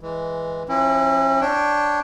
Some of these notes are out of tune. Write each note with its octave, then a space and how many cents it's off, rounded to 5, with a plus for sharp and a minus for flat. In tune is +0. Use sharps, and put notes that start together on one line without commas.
E3 +0 G#3 +0
F3 +0 C#4 -40 E4 +0
D4 +0 C#5 +0 G5 +0